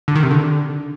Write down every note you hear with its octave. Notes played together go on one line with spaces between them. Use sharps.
D3
D#3
C3
D3